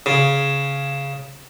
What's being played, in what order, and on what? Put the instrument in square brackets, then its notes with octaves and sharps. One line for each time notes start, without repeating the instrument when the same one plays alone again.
[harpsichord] C#3